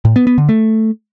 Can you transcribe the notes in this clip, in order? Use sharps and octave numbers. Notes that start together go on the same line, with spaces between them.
A2
B3
B3
D3
A3